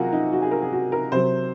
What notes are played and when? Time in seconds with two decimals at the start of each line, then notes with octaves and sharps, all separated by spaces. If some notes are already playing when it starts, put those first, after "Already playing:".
Already playing: C3 F#3 F4 F#4 G#4 A#4 F#5
0.12 D#4
0.32 F#4
0.42 G#4
0.51 A#4
0.62 G#4
0.72 F#4
0.92 A#4
1.12 C3 F#3 C5